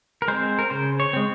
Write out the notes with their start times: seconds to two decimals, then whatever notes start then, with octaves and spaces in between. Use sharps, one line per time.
0.22 A#4
0.28 G#3 C4 C5
0.59 A#4
0.70 C#3 C5
1.00 C#5
1.13 G#3 C4